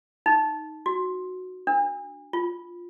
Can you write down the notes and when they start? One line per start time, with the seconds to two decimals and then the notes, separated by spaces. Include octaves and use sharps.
0.26 D#4
0.86 F#4
1.67 D4
2.33 F4